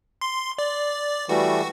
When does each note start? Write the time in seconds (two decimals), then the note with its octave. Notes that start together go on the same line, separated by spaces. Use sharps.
0.21 C6
0.58 D5
1.29 E3 G3 A3 F#4